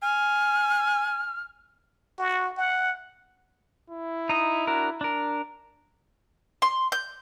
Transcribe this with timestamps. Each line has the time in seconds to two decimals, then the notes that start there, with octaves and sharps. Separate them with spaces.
0.02 G#5 F6
2.18 F#4
2.57 F#5
3.90 E4
4.29 D#4 D#5
4.67 D4 F#4 A#4
5.01 D4 A#4
6.62 C6
6.92 G6